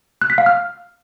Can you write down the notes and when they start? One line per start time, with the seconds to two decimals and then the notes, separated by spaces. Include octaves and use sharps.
0.22 F#6
0.30 B6
0.38 F5
0.46 F6